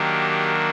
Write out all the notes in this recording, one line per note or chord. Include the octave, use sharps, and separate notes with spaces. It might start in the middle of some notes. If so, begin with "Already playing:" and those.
Already playing: D#3 F#3 A#3 D4 G4